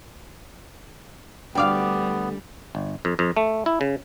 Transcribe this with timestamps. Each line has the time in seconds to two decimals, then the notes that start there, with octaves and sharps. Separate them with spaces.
1.55 D2 G3 B3 D5 F5 G5 D6
2.75 G1
3.05 F2
3.19 F2
3.37 A3
3.66 E4
3.81 C#3